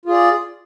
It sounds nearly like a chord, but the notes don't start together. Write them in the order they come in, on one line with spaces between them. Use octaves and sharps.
F4 G#4 D5